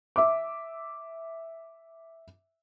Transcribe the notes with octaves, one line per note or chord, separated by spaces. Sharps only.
E5 D6